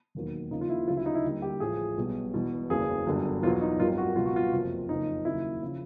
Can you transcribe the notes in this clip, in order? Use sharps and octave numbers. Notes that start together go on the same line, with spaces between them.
E1 D#2 D#3 F#3
D#2 C#3 F3 D#4
F4
E4
D2 C#3 F#3 F4
E4
D#4
E4
D#2 D3 G3
G4
A1 A2 F3 G#4
B1 B2 G3
E1 E2 B2
F#1 E2 C#3 F#3 G#4
G1 F#2 D3 G3
E2 B2 F#3 F4
D#4
G#1 F#2 D#3 G3 F4
F#4
C#2 B2 F#3 F4
F#4
F4
F#1 F2 C3
F#1 F2 C#3 D#4
D#2 C#3 F#3 E4
C#3 F3